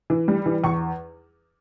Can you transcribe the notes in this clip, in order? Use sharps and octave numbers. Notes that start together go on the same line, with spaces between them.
E3
G3
E3
E2 C#6